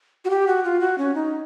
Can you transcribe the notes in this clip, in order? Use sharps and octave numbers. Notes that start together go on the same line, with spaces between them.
F#4
G4
F#4
F4
F#4
C#4
D#4